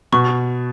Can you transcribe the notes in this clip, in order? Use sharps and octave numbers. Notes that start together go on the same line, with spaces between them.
B2 C#6